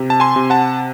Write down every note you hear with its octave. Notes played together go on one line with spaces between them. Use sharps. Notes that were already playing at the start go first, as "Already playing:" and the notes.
Already playing: C3
A5
G#5 C6
C3
F#5 A5